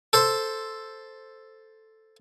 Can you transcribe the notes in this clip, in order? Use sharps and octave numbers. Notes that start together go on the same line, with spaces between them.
A4 C5